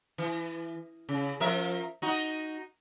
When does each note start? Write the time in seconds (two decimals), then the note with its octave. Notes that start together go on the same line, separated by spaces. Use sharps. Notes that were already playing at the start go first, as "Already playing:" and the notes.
0.18 E3
1.09 C#3
1.40 F3 A#4 E5
2.02 D#4 F#4